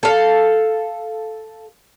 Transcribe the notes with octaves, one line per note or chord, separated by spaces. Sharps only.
A4 F5